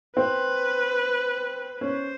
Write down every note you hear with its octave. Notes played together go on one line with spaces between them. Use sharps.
C4 B4
C#4 C5